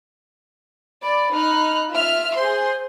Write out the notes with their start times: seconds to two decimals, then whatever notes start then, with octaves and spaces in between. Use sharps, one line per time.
1.03 D5 B5
1.34 D#4 F6 F#6
1.90 F4 E5 F6
2.35 G#4 C5 C6